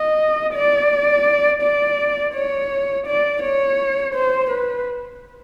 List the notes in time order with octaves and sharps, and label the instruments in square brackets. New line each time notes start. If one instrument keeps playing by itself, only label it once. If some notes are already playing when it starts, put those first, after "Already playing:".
Already playing: [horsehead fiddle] D#5
D5
D5
C#5
D5
C#5
C5
B4